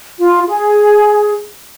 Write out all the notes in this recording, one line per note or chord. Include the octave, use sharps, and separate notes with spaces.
F4
G#4